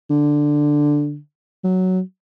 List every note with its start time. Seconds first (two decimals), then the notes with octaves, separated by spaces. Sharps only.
0.10 D3
1.64 F#3